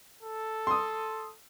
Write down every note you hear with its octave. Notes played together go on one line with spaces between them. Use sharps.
A4
C6 D#6